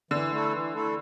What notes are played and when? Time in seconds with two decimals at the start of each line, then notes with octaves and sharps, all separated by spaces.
0.11 D3 E3
0.32 A3 E4 A4
0.53 E3
0.74 A3 E4 A4